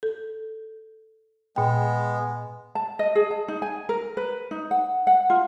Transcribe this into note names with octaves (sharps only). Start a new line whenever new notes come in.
A4
A#2 G#3 B3 G5
A5
D#5
G#4
A5
D#4
G#5
A#4
B4
D#4
F#5
F#5
F4